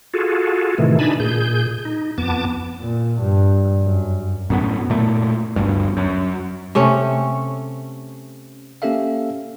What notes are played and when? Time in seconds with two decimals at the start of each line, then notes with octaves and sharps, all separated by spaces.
0.14 F4 F#4 G#4 A4
0.78 A2 C3 D#3 E3 A3
0.99 D4 D#4 G#5 A5 B5
1.20 A#2 G#4 G6
1.85 D#4
2.18 F2 B3 A5 D6
2.81 A#2
3.22 G2
3.82 F#2
4.50 F#2 A2 B3
4.90 A#2 A3
5.56 G1 D2 G2
5.97 F#2
6.75 C3 A3 C#4
8.82 A#3 C#4 G4 A4 E5 F5